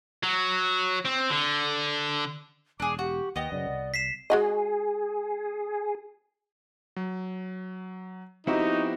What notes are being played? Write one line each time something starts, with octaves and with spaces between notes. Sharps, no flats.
F#3
C4
D3
E1 D4 G#4 D6
F#4 G4
D#2 B3 D#5 G5
F#2 C#3 C#4 D5
C2
B6 C7 E7
G#3 F#4 G#4 D#5
F#3
F3 B3 C4 D#4 E4 F#4 G4